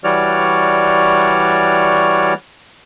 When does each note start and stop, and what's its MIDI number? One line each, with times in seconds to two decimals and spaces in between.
0.04 2.34 52
0.04 2.34 55
0.04 2.34 66
0.04 2.34 73
0.04 2.34 74
0.04 2.34 89